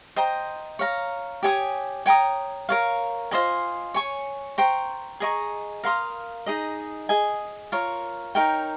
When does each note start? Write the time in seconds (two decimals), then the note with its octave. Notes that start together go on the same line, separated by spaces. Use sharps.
0.16 C5 D#5 G5 A#5
0.79 C#5 F5 A#5
1.43 G4 C#5 G#5 D#6
2.06 C#5 G5 A#5 D#6
2.69 A#4 C#5 F5
3.31 F4 C5 D#5 G#5
3.94 C#5 G#5 C#6
4.58 C5 G5 A#5 C#6
5.20 G#4 D#5 A#5 C#6
5.84 A#4 F5 C6 D#6
6.46 D#4 G#4 D#5
7.09 G#4 D#5 G#5
7.72 F4 A#4 C#5
8.35 D#4 A#4 C#5 G5